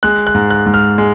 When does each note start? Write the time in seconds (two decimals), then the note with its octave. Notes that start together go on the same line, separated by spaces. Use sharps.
0.03 G#3 F#6
0.27 F#6
0.35 G#2
0.50 F#6
0.66 G#2
0.74 F6
0.98 G#3